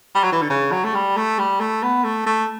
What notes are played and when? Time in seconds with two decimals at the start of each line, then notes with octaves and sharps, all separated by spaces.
0.15 G3
0.24 F#3
0.32 E3
0.42 D3
0.50 C#3
0.72 F#3
0.84 A3
0.94 G3
1.16 A3
1.39 G3
1.60 A3
1.83 B3
2.04 A3
2.26 A3